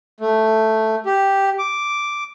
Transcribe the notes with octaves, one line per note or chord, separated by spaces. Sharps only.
A3
G4
D6